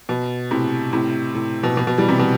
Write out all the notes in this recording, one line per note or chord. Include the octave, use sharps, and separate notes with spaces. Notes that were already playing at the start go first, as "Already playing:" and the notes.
B2
A2 C3
A2 C3
A2
B2
B2
B2
E3 G3
C3 E3
B2